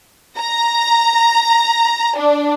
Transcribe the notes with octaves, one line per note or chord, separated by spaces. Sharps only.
A#5
D4